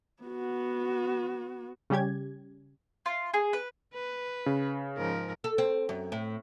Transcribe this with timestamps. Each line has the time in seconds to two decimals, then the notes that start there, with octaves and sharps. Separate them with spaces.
0.23 B3 F#4
1.90 C#3 G3 C#4 G4 G#6
3.06 F4
3.34 G#4
3.53 B4
3.93 B4
4.46 C#3
4.97 G#2 F3 A#4
5.44 A4
5.58 C4
5.89 F#2
6.12 A2